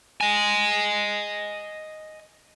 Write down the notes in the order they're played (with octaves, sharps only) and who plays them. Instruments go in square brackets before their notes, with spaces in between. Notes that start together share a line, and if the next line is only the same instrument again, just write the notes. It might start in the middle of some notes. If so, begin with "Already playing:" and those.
[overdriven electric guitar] D#5 G#5